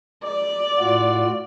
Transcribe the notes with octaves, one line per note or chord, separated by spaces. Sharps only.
D5
A2 F4 F#4